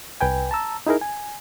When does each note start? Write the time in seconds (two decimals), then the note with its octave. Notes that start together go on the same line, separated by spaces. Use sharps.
0.21 C2 B4 G5 G#5
0.51 A5 A#5 E6
0.87 D#4 E4 G#4 A#4
1.01 G#5